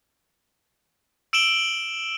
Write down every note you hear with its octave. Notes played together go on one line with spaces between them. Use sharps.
E6 D7 E7 F#7 G7